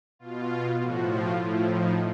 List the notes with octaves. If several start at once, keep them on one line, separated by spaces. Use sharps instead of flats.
B2 F4
A2 F3 F#4
F4
A2 F3 E4
D#4